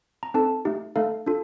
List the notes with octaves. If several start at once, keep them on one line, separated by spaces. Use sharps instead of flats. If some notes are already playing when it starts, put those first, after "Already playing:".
A#5
C4 D#4 A4 A5
A3 D#4 G4
A3 D#4 A4 F5
D4 F4 A4